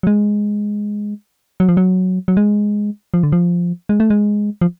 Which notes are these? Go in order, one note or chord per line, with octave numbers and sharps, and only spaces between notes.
F#3
G#3
F#3
F3
F#3
F#3
G#3
F3
D3
F3
G#3
A3
G#3
F3